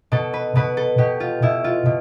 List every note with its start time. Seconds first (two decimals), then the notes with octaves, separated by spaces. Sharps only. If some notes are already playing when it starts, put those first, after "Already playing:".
0.12 B2 A4
0.33 B4
0.56 B2 B4
0.77 A4
0.98 B2 G4
1.20 F4
1.42 B2 E4
1.64 F4
1.86 B2